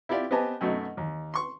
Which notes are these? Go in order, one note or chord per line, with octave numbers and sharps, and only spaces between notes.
E4 F4 G4 D5 F5
B3 C4 G4 D#5 G#5 A5
F#2 B2 A3 D#4
D#2
C6 C#6